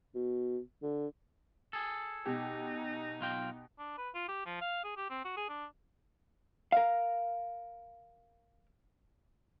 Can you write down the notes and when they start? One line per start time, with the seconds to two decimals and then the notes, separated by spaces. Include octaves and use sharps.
0.15 B2
0.82 D3
1.73 G#4 A4
2.26 B2 D#4 G4
3.21 B1 F4 G5
3.79 D4
3.98 B4
4.15 F4
4.28 G4
4.46 F3
4.61 F5
4.84 G#4
4.97 G4
5.10 C4
5.25 F#4
5.37 G#4
5.49 D4
6.72 A#4 F5